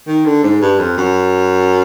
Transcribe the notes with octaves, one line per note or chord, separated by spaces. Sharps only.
D#3
D3
G#2
G2
F2
F#2